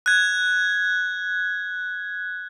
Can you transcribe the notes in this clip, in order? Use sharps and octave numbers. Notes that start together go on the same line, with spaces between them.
F#6 G#6